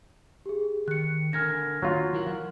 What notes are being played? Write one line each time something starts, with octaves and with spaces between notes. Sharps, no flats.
G4 G#4
D#3 F#6 C#7
D3 A#4 G#5 F6 G#6 A#6
D#3 F#3 A#3 D4 F4
E3 E4 A#4 F#5